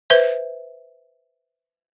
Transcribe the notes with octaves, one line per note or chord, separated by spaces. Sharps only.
B4 C5 E5